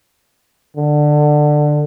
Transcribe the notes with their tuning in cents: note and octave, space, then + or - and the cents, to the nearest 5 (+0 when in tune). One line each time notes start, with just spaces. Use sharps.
D3 +15